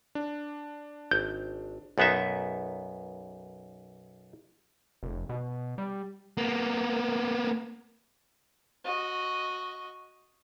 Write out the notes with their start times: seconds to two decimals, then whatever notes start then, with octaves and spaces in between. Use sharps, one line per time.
0.15 D4
1.11 G#1 G6
1.98 B1 F#2 B3 D#4 E5
5.03 F1
5.29 B2
5.78 G3
6.37 A#3 B3
8.85 F#4 D#5